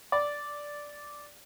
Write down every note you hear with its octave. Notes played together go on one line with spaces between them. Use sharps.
D5